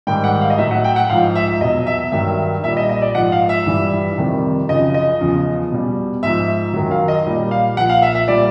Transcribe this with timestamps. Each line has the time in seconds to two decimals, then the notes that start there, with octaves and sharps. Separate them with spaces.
0.07 G#2 D#3 G3 G5
0.24 F#5
0.41 F5
0.50 D#5
0.58 A2 F#3 E5
0.71 F#5
0.84 G5
0.96 F#5
1.10 G#2 F3 F5
1.35 E5
1.61 E2 B2 F#3 D#5
1.87 E5
2.12 G2 D#3 F#3 E5
2.63 A#2 E5
2.68 G3
2.77 D#5
2.89 D#5
3.02 D5
3.15 G#2 F3 F#5
3.32 F5
3.49 E5
3.66 G2 E3 G3
4.18 F2 C3 D#3 G3
4.69 F#2 C#3 F3 D#5
4.94 D#5
5.21 E2 C#3 F3
5.72 B2 G3
6.23 G#2 F3 E5
6.74 F#2 D#3 F#3
6.91 F5
7.08 D#5
7.25 A#2 G3
7.51 F5
7.77 F3 F#5
7.80 A#2
7.90 F5
8.02 E5
8.15 E5
8.28 A#2 G3 D5